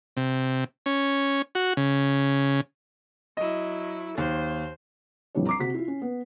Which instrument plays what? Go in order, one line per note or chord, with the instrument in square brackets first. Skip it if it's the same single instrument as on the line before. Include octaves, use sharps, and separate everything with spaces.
[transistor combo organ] C3
C#4
F#4
C#3
[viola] F#3 E4 [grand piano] D#5
[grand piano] D#2 [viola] C5
[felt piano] A#1 F2 E3 G3 D4 C#5
A#5 D6 C7
C3 F#4 B6
E4 F4
C#4
B3